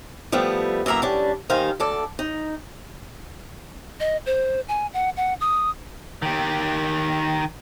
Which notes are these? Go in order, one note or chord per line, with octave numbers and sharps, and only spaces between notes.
F3 G3 A3 B3
F#2 E3 A#3 E5 A#5
G3 C#4 D4
D#2 D#3 D#4 C5 F5 G#5
D2 A4 D5
D#4
D#5
C5
G#5
F#5
F#5
D#6
D#3 G4